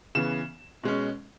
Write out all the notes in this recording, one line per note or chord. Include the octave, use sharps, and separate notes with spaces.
C#3 E3 B3 E7
B2 G#3 C#4